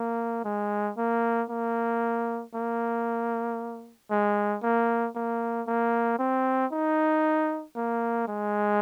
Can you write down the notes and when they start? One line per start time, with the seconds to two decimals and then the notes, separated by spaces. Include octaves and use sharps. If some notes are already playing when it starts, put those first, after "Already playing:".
Already playing: A#3
0.45 G#3
0.97 A#3
1.50 A#3
2.55 A#3
4.11 G#3
4.63 A#3
5.15 A#3
5.67 A#3
6.19 C4
6.72 D#4
7.76 A#3
8.28 G#3